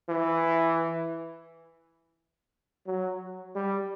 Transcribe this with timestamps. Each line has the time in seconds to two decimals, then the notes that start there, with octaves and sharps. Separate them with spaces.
0.09 E3
2.87 F#3
3.56 G3